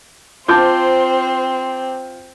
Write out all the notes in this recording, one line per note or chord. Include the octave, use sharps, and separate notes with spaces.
C4 F4 C5 A5 D6 G6